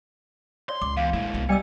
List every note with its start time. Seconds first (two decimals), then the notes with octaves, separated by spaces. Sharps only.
0.69 C#5 D5 C6
0.82 C#2 D6
0.97 E2 F5
1.14 G#3 A#3 E4
1.34 C2 B3
1.49 G3 B4 D#5 G#5 E6 C#7